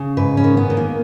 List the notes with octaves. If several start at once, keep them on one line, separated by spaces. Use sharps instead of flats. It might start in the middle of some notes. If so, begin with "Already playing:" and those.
Already playing: C#3
G#2 B4
C#4
D#3
B3
D#3
A#3